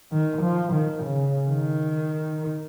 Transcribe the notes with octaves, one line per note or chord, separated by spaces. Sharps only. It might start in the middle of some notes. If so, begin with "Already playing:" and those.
D#3
F3
D#3
C#3
D#3